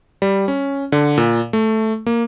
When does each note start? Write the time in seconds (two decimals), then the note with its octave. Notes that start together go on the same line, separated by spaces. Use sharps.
0.22 G3
0.48 C#4
0.92 D3
1.18 A#2
1.53 A3
2.06 A#3